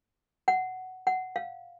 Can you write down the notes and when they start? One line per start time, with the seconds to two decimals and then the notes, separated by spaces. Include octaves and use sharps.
0.48 F#5
1.07 F#5
1.36 F5